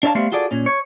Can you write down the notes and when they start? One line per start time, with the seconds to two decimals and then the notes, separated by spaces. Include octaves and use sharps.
0.03 D4 C#5 D5 E5 F5 A5
0.15 G3 A3 B3 C5 E5 F5
0.32 F4 F#4 G#4 A4 D5
0.51 A#2 C#4
0.66 C#5